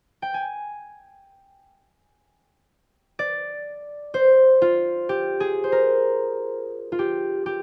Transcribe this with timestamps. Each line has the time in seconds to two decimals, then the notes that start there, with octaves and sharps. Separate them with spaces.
0.22 G5
0.34 G#5
3.19 D5
4.14 C5
4.62 F4
5.09 G4
5.40 G#4
5.64 C5
5.72 A#4
6.92 F4
6.99 G4
7.46 G4